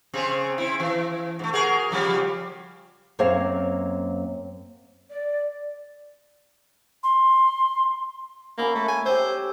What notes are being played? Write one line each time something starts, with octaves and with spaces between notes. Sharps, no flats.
C#3 C4 G#4
C4 E4
E3
G#2 A3
F#4 G#4 A#4
C#3 F3 G3
F#2 A#3 C4 C5 C#5 F5
D5
C6
A#3 C#4 E4 F#4
A3
G#5
G4 A4 C5 E5